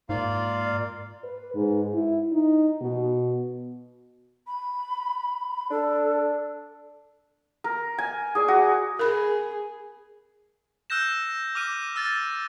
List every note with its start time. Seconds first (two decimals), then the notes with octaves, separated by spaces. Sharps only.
0.09 G#2 A#3 F4 D5 F5
1.24 B4
1.55 G#2
1.94 E4
2.32 D#4
2.81 B2
4.47 B5
5.71 D4 A4
7.64 A#4
7.98 G#5
8.35 G#4 D5
8.48 F#4
8.99 G#4 A#4 B5
10.90 E6 F#6 G6 A#6 E7
11.55 D6 F6 D#7
11.96 E6 A6